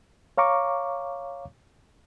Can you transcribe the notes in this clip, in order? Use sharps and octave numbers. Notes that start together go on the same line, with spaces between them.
C#5 F5 A#5 C#6 D6